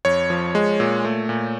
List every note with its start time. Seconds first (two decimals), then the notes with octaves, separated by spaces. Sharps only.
0.05 F2 C#5
0.30 F3
0.55 G#3
0.80 A#2
1.05 A3
1.29 A#2